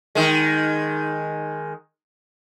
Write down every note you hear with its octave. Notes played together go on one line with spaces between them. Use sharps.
D#3 G#3